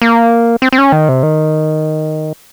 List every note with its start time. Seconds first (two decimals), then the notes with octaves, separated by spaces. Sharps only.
0.02 A#3
0.62 C4
0.73 C4
0.78 C#4
0.92 D#3
1.09 C3
1.23 D#3